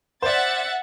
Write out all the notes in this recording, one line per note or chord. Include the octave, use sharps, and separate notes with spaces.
C5 D5 E5 F#5 A6